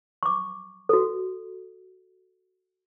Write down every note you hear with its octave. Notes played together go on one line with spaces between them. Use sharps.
C#6 D6
F#4 A4